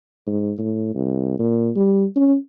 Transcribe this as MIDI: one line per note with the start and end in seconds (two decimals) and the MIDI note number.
0.27 0.52 44
0.58 0.92 45
0.94 1.36 36
1.39 1.70 46
1.76 2.05 55
2.16 2.36 61